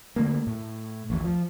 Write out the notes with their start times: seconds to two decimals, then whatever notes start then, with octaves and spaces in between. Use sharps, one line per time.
0.16 D3 A3 A#3
0.47 A2
1.10 A1 D#2
1.24 F3